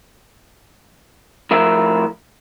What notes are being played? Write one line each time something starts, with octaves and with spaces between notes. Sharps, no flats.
A2 F3 A#4 E5